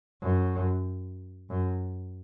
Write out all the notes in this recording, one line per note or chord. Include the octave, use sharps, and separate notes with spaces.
F#2
F#2